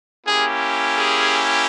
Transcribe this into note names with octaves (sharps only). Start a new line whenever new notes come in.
A#3 C#4 E4 G4 G#4
G#4